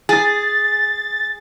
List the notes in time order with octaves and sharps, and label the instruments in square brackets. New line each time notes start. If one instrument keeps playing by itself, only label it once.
[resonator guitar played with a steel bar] G#4 [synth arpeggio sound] A6